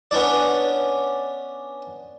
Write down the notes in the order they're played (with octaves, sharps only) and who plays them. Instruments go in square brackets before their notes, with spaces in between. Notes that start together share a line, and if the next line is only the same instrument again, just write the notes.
[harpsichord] B3 C#4 D4 D5